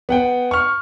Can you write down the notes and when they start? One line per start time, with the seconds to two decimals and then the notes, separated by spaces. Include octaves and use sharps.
0.09 B3 F#5 G5
0.51 C#6 F6